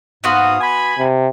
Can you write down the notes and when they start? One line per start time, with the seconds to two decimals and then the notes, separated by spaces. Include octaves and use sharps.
0.24 G#2 B3 F#4 F5 C6 D#6
0.61 G#5 B5
0.99 C3